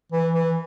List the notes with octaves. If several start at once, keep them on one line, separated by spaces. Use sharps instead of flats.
E3
E3